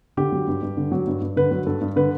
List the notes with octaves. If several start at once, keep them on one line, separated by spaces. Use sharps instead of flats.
D3 G4
F#3
G2
G2
D3
F#3
G2
G2
D3 B4
F#3
G2 A4
G2
D3 B4